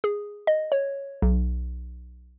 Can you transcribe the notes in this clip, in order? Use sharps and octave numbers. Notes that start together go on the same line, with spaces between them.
G#4
D#5
C#5
B1